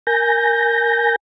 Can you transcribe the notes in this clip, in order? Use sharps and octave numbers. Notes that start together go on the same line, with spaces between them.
A#4 G#5 G6 A#6